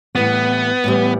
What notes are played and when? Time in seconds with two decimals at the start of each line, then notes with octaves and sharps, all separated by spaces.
0.15 A2 E3 G3 B3
0.84 A2 E3 G3